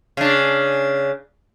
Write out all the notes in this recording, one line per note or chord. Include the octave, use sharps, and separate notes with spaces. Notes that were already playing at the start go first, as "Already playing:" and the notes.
C#3 D4